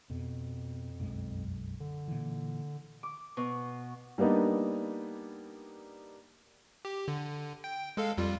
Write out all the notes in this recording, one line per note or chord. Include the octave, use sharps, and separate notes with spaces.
F2 B2
B1 F#2 G#3
D3
A#2 E3
D6
B2
G3 A#3 B3 D4 D#4
G4
D3
G5
G#3 A4 F5
F2 G3 F4